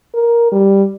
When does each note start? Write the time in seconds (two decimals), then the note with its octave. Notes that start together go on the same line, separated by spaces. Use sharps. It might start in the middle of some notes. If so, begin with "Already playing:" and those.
0.14 A#4
0.52 G3